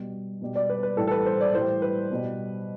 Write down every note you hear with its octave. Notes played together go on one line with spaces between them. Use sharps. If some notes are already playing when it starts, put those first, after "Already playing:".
Already playing: B2 G3
B2 G3
D5
B4
B4
A2 E3 G3 A4
A4
B4
C5
D5
A2 E3 G3 C5
B4
B2 G3